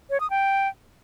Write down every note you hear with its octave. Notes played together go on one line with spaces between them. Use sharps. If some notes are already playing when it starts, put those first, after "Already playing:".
C#5
D#6
G5